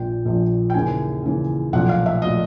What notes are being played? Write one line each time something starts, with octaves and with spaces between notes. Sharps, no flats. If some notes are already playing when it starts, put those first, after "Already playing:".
Already playing: A#1 A#2 F3 G5
A#1 A#2 F3
G5
D#2 C#3 E3 G#5
D#2 C#3 E3
B1 A#2 F3 F#5
F5
E5
A#2 F3 D#5